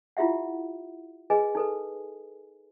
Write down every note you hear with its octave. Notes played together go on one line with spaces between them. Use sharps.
E4 F4 G4 E5 F#5
G#4 B4 D#5 G#5
D#4 A4 B4